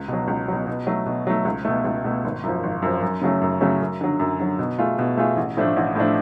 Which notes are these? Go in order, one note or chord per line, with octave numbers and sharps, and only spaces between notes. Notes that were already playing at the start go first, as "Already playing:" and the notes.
Already playing: C#2
B2 F#3
C#2
B2 F#3
B2
F#3 A3
B2
F#3 A3
C#2
B2 A3
C#2
B2 A3
G#1
F#2 F3
G#1
F#2 F3
F#2
C#3 F#3 A3 C#4
F#2
C#3 F#3 A3 C#4
F#2
D3 F#3
F#2
D3 F#3
B2
A3 F4 G#4
B2
A3 F4 G#4
A1
A2 F3 A3 D4
A1
A2 F3 A3 D4